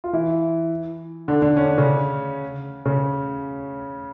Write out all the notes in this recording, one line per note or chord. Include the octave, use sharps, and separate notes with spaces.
F4
E3 E4
D3 D4
D3 D4
C#4
D4
C#3 C#4
C#3 C#4